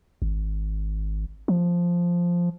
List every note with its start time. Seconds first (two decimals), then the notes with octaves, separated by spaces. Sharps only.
0.22 G#1
1.48 F3